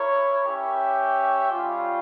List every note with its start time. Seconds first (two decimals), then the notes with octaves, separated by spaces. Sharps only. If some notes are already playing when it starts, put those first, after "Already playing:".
Already playing: E4 A#4 C#5
0.45 C#4 G4 C#5 E5 G5
1.52 G3 C#4 F4